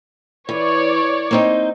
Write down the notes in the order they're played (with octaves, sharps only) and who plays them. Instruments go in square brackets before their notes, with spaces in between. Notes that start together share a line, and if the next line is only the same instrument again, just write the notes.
[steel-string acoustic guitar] E3 [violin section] C#5 D5
[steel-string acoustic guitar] A#3 C4 D#4